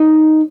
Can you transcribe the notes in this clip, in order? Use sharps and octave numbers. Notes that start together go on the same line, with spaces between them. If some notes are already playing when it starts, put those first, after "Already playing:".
Already playing: D#4